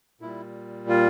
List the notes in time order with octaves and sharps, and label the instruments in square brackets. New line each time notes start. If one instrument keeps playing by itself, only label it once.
[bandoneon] A#2 G3 E4
F4